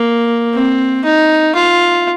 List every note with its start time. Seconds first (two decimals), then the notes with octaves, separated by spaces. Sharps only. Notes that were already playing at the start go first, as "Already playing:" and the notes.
Already playing: A#3
0.53 C4
1.04 D#4
1.55 F4